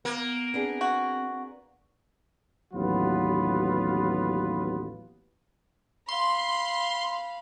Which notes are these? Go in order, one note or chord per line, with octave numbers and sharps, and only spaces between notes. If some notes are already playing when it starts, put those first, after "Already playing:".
A#3 B3
B3 C4 D4 G#4
F#4
A1 D#2 F#3 B3 F4 B4
F5 B5 C6